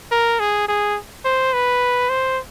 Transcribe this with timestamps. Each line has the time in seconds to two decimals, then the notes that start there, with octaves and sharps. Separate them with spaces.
0.11 A#4
0.39 G#4
0.68 G#4
1.25 C5
1.53 B4
2.09 C5